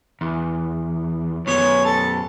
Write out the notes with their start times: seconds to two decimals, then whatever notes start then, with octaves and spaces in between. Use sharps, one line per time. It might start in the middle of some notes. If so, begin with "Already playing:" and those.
0.21 E2
1.47 F#2 B3 C#5
1.85 A4